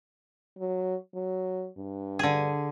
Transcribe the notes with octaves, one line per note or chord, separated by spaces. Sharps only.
F#3
F#3
G2
D3 G#4